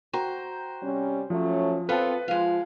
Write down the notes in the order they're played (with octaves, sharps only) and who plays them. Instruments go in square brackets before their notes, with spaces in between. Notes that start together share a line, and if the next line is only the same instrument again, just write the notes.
[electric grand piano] F#4 G5 A#5 [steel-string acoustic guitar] C5
[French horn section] C3 G3 C#4
[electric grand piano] F3 [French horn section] F#3 A3 C#4
[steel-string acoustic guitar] B3 F4 A4 [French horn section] C4 [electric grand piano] B4 A5
[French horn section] F3 F4 [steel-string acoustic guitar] G#3 F5